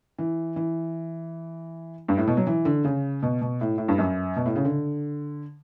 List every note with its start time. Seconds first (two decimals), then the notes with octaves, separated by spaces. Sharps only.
0.18 E3
0.56 E3
2.08 G2
2.17 A2
2.27 B2
2.37 F#3
2.47 E3
2.65 D3
2.84 C#3
3.22 B2
3.41 B2
3.61 A2
3.78 A2
3.88 G2
3.98 F#2
4.36 B2
4.46 A2
4.56 C#3
4.65 D3